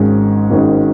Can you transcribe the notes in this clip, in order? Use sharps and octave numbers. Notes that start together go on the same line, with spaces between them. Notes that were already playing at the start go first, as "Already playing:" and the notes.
Already playing: G#1 G#2 D#3 G#3 C#4
G#1 G#2 D#3 G#3 C#4